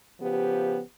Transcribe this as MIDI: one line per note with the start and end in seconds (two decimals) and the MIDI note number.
0.21 0.80 49
0.21 0.80 53
0.21 0.80 59
0.21 0.80 67